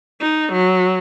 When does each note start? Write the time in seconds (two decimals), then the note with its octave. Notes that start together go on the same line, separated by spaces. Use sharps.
0.20 D#4
0.52 F#3